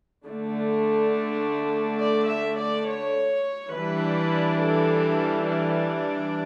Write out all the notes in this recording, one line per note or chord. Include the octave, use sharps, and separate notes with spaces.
D3 A3 D4
D5
E5
D5
C#5
E3 G3 D4 B4
A4
D4